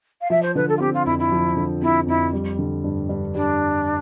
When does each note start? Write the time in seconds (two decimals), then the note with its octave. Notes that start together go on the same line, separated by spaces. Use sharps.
0.21 F5
0.30 F3 E5
0.42 C5
0.55 D3 B4
0.68 A4
0.76 F4
0.80 C4 G4
0.93 F4
1.05 F2 E4
1.18 E4
1.32 F3
1.57 D3
1.82 C4 E4
2.07 F2 E4
2.33 G3
2.59 D3
2.84 G2
3.09 G2
3.35 G3 D4